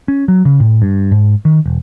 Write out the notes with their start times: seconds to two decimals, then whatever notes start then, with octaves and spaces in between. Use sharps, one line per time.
0.08 C#4
0.28 F#3
0.45 C#3
0.60 A2
0.82 G2
1.11 G#2
1.45 D#3
1.66 E1